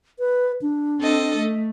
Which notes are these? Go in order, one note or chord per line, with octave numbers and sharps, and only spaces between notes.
B4
D4
C4 A4 D#5
A3